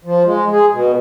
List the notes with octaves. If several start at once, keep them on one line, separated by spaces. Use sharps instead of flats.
F3
G#3
G#4
B2